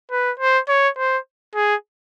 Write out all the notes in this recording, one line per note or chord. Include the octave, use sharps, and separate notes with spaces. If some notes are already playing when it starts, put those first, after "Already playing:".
B4
C5
C#5
C5
G#4